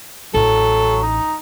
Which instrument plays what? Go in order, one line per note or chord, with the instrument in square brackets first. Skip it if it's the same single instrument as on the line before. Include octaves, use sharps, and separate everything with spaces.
[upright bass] A1 [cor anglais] F#3 [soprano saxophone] A4
[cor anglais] D#4